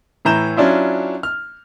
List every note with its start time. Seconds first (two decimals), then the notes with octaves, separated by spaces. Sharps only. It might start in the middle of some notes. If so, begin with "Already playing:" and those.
0.25 A2 E3 A#5 G6 E7
0.57 F#3 C#4 D4 E4 F4
1.23 F6